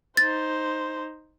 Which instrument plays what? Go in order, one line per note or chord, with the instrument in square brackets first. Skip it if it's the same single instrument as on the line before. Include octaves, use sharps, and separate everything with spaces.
[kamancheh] D#4 C5 [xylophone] A6